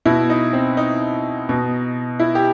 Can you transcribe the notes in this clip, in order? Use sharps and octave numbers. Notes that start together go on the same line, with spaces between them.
B2 E4
D#4
C4
D#4
B2
E4
G4